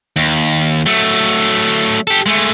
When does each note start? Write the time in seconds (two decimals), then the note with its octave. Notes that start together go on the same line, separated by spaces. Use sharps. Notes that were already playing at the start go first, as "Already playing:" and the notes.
0.16 D#2
0.86 F#3 A3
2.07 G4 A4
2.26 G#3 A3